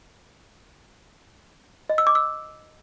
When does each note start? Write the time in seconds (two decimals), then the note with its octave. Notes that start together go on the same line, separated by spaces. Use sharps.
1.90 D#5
1.98 E6
2.07 D6
2.15 E6